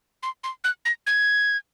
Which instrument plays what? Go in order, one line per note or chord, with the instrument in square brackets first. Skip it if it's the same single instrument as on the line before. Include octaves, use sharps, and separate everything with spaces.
[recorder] C6
C6
F#6
A#6
G#6